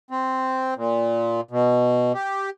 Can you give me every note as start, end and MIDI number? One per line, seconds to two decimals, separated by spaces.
0.11 0.74 60
0.76 1.41 46
1.51 2.12 47
2.14 2.50 67